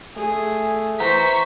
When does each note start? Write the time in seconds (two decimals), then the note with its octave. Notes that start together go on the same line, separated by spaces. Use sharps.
0.16 A3 G#4
1.00 E3 C5 A#5 C#6 B6